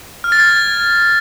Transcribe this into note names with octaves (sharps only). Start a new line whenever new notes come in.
F6
A6
G#6